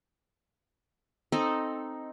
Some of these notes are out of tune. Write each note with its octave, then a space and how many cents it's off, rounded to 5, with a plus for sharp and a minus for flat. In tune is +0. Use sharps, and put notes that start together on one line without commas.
C4 +0 D#4 +0 A4 +0